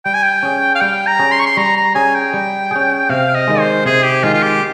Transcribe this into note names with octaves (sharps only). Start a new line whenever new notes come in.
G3 G5
G#5
G5
C#4 G#4
F5
G3 G5
A#5
C#4 G#4
C6
C#6
C6
G3 A#5
A#5
C#4 G#4 G#5
G5
G3
C#4 G#4
C3 F5
D#5
D#3 G#3
C5
C3 G#4
G4
D#3 G#3 F4
F4
G4